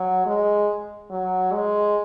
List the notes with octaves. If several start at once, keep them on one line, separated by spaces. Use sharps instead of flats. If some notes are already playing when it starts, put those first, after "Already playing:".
Already playing: F#3
G#3
F#3
G#3